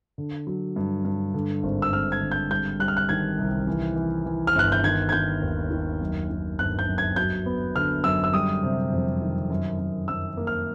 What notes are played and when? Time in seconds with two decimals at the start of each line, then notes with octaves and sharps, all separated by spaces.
0.18 D3
0.47 F#3
0.76 G2
1.05 G2
1.34 D3
1.63 G#1
1.82 E6
1.92 G#1 F6
2.12 G#6
2.21 D3
2.32 G6
2.50 G3 G6
2.79 G3 F#6
2.88 F6
2.97 F#6
3.09 D#3 G#6
3.38 C2
3.67 E3
3.96 E3
4.26 E3
4.47 F6
4.55 G1 F#6
4.72 G6
4.84 D#3 G#6
5.09 G#6
5.12 D#3 G6
5.42 D#2
5.71 D#3
6.01 F#2
6.30 D#3
6.59 G1 F#6
6.79 G6
6.88 F#2
6.98 G#6
7.16 F#3 G6
7.46 B3
7.75 D3 F6
8.04 F#2 E6
8.24 E6
8.33 G3 D#6
8.63 C3
8.92 F2
9.22 D#3
9.50 F#2
9.79 F#2
10.08 F#2 E6
10.37 A#3
10.47 F6